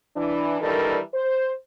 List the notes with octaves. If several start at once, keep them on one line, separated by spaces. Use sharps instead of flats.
E3 D4
D#3 E3 G3 D4 A4 A#4
C5